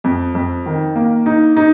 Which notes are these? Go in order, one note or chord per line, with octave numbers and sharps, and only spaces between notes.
F2
F2
D#3
A#3
D#4
D#4